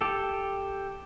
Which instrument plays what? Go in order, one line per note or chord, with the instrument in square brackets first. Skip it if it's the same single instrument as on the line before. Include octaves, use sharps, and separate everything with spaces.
[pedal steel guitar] G4 A4